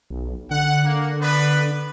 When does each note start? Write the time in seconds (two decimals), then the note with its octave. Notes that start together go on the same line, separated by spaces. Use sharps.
0.10 B1
0.51 D3 F#5
0.85 A#3
1.21 B3 D4 B4